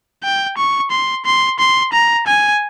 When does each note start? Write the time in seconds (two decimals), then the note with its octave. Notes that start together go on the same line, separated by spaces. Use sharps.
0.23 G5
0.57 C#6
0.91 C6
1.25 C6
1.59 C6
1.93 A#5
2.27 G#5